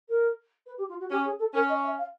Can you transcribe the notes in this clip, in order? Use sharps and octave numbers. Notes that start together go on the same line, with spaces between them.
A#4
B4
G4
F4
F#4
C#4 G4
G#4
A4
C#4 A#4
D#5
E5
F5